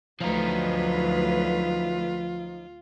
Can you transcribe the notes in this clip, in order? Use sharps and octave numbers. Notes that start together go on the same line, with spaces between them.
D2 F3 F#3 D#4 F4 B4